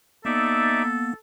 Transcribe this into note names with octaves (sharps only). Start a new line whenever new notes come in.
A#3 B3 D#4 A4 D5 E5